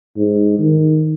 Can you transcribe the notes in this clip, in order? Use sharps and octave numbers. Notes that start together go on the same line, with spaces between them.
G#2
D#3